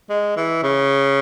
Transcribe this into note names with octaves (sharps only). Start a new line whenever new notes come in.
G#3
E3
C#3